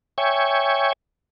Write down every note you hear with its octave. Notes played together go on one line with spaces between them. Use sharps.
C#5 E5 G5 G#5 C#6